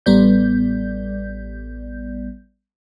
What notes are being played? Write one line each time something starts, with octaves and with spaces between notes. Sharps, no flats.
A1 G3 B3 D5 G6